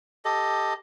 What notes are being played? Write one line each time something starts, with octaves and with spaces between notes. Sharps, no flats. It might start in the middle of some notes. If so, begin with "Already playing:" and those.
G4 A4 D#5